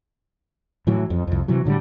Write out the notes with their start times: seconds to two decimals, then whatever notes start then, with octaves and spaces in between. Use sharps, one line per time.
0.87 A2 E3 F#3
1.10 F2
1.27 C2 F2
1.48 C3 E3 F#3
1.65 A2 D3 F#3 G3